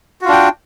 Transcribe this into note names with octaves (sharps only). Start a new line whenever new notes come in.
D4 F4 F#4 G5